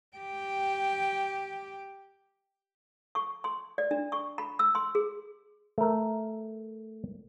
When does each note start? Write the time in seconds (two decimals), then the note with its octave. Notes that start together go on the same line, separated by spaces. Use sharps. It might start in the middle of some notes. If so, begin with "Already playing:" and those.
0.17 G4 G5
3.15 C#6
3.44 C6
3.78 D5
3.91 D4
4.12 C#6
4.38 B5
4.59 E6
4.75 C6
4.95 G#4
5.78 A3 A#4